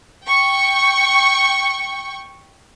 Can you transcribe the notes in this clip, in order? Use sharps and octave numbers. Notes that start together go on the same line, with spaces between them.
G5 C#6